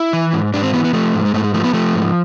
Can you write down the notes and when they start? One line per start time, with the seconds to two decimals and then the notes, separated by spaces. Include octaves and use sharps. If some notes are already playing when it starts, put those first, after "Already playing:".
Already playing: E4
0.13 E3
0.33 G#2
0.54 G#2 D4
0.63 C4
0.73 E3 B3
0.84 B3
0.93 F3 A3
1.14 G#2
1.25 G#3
1.34 G#2 A3
1.44 G#3
1.54 F3 A3
1.64 B3
1.73 F3 A3
1.95 G#2